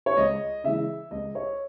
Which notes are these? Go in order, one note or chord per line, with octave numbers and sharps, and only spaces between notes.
C#5
C#2 D#5
C#3 E3 G#3 E5
C#2 D#5
C#5